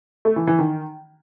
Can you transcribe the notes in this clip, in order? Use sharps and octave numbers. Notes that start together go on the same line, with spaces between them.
A3
E3
E3
D#3